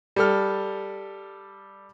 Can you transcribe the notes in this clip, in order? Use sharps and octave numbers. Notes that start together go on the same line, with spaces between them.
G3 A4 F6